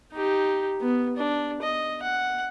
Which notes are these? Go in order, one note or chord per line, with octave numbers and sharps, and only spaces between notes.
D#4 G4
B3
D4
D#5
F#5